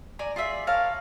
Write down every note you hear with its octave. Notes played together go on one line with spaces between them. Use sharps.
D5 G#5 A#5
F4 G#4 D5 E5
A#4 C#5 F5 A5